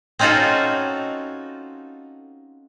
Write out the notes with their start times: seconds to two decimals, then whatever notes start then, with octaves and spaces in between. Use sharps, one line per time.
0.19 C4 C#4 D#4 F4 F#4 A4